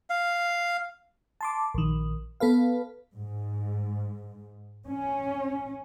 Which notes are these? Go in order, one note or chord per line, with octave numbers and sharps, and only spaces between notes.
F5
A5 C6 D6
A#1 D#3
B3 A4 B4 F5
G#2
C#4